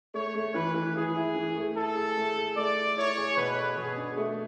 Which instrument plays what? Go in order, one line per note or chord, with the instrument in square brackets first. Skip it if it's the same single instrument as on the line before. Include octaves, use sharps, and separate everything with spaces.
[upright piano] A3 [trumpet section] C#5
[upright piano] A3
[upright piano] E3 [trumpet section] B4
[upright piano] E3
[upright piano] E3 [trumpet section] G#4
[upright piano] E4
E3
A3
[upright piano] E4 [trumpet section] A4
[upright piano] G#4
A3
G#4
[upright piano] A3 [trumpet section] D5
[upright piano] E4
[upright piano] E4 [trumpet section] C#5
[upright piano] G#4
[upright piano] B2 [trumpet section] B4
[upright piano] A4
[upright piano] B2 [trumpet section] G#4
[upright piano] D4
A3